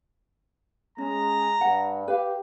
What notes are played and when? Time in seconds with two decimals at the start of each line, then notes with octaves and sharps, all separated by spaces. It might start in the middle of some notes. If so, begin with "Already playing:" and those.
0.98 G#3 C#4 A#5
1.61 G2 F#5
2.08 G4 B4 F5